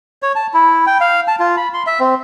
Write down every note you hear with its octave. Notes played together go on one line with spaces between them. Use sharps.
C#5
A5
E4
G5
F5
A5
F4
B5
C6
E5
C4